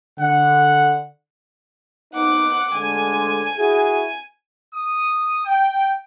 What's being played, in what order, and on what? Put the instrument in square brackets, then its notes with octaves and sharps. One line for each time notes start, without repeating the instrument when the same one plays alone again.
[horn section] D3 F#5
[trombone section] B3 D#4 [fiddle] F#5 D6
[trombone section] D2 D3 G#3 [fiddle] G#5
[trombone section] E4 F#4 G#4
[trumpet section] D#6
G5